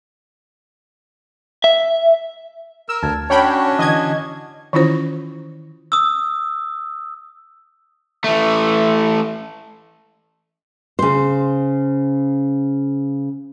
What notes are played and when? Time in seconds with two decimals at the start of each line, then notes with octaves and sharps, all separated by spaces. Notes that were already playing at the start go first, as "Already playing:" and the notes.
1.64 E5
2.89 A#4 E6
3.03 D2 A5 G#6
3.30 C#4 D4 F#4 C#5 G5 B5
3.79 D3 E3 D#5 G#6
4.73 D#3 E3 C#4 E4 F4 C5
5.92 D#6 E6
8.24 E3 A3
10.99 C#3 C5